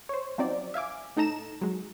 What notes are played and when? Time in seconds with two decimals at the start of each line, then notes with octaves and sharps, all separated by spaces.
0.09 C5 C#5
0.38 F3 F#3 C4 D#4 D5
0.74 E5 F5 G#5 D6
1.16 A2 D#4 A4 A#5 E7
1.61 F#3 G#3